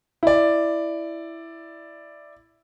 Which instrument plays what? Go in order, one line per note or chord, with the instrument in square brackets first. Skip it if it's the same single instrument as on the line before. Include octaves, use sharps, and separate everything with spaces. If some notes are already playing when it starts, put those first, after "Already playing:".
[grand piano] E4 D5